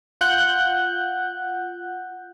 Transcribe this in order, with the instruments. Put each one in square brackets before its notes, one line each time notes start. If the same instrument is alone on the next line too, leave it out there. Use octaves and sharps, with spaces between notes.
[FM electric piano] F4 F#5 F#6 G6